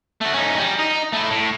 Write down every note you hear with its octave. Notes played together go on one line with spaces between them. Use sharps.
A3 F#4
C#4 D#4
G3
D#4
A3 E4
A2